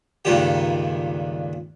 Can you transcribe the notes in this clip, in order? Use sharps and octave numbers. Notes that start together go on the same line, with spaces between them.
C#2 G2 A#2 D#3 G4